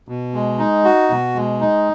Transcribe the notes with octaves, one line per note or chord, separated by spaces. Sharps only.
B2
G#3
D#4
F#4
B2
G#3
D#4